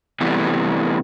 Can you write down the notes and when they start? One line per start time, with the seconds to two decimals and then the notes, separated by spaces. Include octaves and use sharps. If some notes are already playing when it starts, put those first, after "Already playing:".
0.21 C3 E3 G3 A3 B3